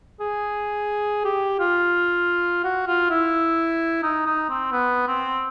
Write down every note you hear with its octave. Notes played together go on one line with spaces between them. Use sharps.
G#4
G4
F4
F#4
F4
E4
D#4
D#4
C4
B3
C4